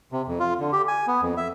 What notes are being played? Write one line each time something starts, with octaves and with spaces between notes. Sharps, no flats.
C3
F2
F4
D3
G4
G#5
B3
F2
E5